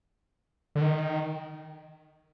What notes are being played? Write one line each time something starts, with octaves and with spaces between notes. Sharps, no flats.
D3
D#3